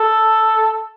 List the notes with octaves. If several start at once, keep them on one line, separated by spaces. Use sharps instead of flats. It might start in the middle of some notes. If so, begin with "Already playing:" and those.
Already playing: A4